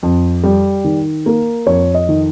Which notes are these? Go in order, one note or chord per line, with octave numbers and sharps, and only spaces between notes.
F2
G3
D#3
A#3
F2 C#5
D#5
D#3